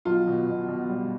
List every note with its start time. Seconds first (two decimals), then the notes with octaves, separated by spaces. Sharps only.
0.05 B1 F4
0.27 B2
0.48 B2
0.68 B2
0.89 G3